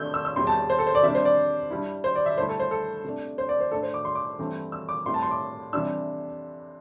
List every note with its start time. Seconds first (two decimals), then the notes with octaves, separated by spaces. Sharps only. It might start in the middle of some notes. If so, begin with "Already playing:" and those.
Already playing: C3 A3 D4 E6 G6
0.14 E6
0.25 E6
0.36 E2 C3 G3 C4 E4 C6
0.47 A5
0.70 C5
0.79 A4
0.87 C5
0.95 D5
1.03 C3 G3 D4 E5
1.15 C5
1.25 D5
1.71 G2 G3 E4
2.04 C5
2.16 D5
2.26 E5
2.38 G2 D3 A3 E4 C5
2.49 A4
2.60 C5
2.71 A4
3.04 C3 A3 D4
3.38 C5
3.49 D5
3.60 C5
3.71 A2 A3 D4 A4
3.83 C5
3.94 D6
4.05 C6
4.15 D6
4.39 G2 E3 A3 C4 E4
4.72 E6
4.89 D6
5.06 A2 G3 C4 E4 C6
5.14 A5
5.22 C6
5.31 D6
5.73 C3 E3 G3 D4 E6